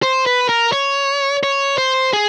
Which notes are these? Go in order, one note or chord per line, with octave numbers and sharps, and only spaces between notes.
C5
B4
A#4
C#5
C#5
C5
G#4